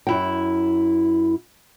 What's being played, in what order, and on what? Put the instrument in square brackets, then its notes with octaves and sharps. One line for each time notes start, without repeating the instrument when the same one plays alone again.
[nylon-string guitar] F#2 E4 G5